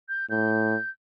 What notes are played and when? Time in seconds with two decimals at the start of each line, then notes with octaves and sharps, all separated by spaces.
0.09 G6
0.30 A2 G6